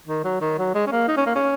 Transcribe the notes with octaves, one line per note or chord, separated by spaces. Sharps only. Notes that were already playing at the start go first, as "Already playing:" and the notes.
D#3
F#3
D#3
F#3
G#3
C#4
A#3
D#4
C#4
A#3
C#4